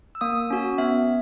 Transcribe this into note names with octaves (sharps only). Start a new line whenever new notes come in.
E6
A#3 D#6
C#4 F#4
B3 E5